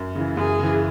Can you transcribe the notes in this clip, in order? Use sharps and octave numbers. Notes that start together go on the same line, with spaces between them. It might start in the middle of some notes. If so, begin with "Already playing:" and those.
Already playing: F#2
C#3 E3
F#2 G#4
C#3 E3